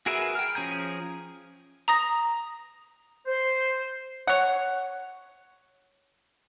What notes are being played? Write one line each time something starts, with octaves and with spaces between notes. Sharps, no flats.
F#4 G#4 A#4 B4 E5
G5 F6
F3 C#4 G#4 A#5 G6
A#5 D#6 A#6
C5
C#5 F#5